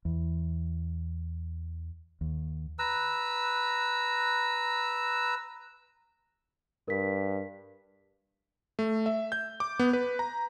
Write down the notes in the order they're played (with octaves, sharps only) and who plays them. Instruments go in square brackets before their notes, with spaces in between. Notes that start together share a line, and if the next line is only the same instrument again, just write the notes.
[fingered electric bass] E2
D#2
[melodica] B4 A#5 E6
[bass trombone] G2 [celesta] A#4 B6
[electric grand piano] A3
E5
G6
D6
B3
B4
A#5